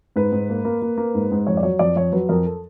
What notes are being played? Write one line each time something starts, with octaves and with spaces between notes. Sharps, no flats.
G#2 B4
G#2
A#3
A#3
A#3
A#3
G#2
G#2
F2 C#5
D5
F#3 C#5
F2 D5
F2 C#5
F#3 B4
F2 A#4
A4